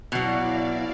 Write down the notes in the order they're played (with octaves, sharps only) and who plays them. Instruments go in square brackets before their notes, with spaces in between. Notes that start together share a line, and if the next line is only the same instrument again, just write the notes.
[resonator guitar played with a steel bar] B2 F#3 [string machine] E4 D5 F5